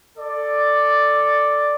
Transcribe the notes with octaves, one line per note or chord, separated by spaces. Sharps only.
A4 D5